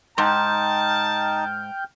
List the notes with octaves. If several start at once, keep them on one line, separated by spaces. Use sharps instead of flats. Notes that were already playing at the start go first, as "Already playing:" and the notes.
G#2 D#4 G5 A5 F6 G6